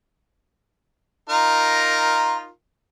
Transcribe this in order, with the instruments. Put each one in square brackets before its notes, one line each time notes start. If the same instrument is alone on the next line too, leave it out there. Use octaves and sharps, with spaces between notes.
[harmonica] D#4 F4 A#4